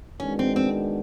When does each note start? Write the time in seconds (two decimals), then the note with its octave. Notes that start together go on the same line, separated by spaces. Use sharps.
0.20 D#3 G#3 B3 C#4 D4 F#4
0.39 C4
0.56 C4